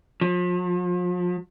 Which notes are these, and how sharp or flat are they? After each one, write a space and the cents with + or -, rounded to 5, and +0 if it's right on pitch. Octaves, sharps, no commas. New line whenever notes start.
F3 +40